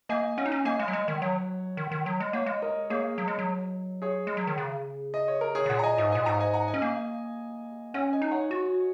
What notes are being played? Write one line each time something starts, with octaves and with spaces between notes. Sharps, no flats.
A#3 D#5 G#5
C#4 C#5 F#5
D#4
C#4
A#3 D#5 G#5
G#3
F#3
G#3
D#3
F#3 C#5 F#5
D#3
D#3
F#3
G#3
A#3 C#5 F#5
G#3
A#4 D#5
A#3 G#4 C#5
F#3
G#3
F#3
G#4 C#5
G#3
F#3
D#3
C#3
D#5
C#5
A#4
G#4 C#5
C#3
A#2 C#5 F#5
A#5
D#5 G#5
G#2 D#5 G#5
D#5 G#5
A#2
G#2 F#5 A#5
D#5 G#5
F#5 A#5
D#5 G#5
C#4
A#3
C#4 C#5 F#5
D#5 G#5
D#4
C#5 F#5
F#4